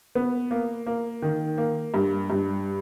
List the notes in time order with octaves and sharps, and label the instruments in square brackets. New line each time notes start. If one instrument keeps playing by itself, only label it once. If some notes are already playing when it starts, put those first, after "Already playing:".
[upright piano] B3
A#3
A#3
D#3
A#3
G2
G2